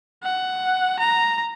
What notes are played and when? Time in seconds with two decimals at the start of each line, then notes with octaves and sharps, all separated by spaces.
0.23 F#5
1.00 A#5